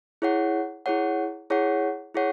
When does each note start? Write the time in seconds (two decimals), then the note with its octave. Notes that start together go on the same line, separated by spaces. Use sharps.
0.22 E4 G#4 C#5 F#5
0.86 E4 G#4 C#5 F#5
1.50 E4 G#4 C#5 F#5
2.14 E4 G#4 C#5 F#5